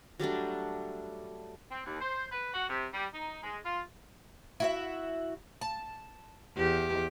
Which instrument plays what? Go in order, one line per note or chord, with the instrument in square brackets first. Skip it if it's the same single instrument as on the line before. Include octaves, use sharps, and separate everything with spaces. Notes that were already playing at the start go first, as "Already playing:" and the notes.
[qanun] F#3 G3 A3 D4
[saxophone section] C4
D#2
C5
B4
F#4
C3
G3
D#4
G#3
F4
[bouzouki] E4 F#4 E5
A5
[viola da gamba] E2 G4